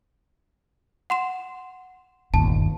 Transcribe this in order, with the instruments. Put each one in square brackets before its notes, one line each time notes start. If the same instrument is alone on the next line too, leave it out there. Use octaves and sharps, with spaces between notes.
[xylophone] F#5 C6 E7
[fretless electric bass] G1 D#2 [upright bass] A#2 [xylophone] A5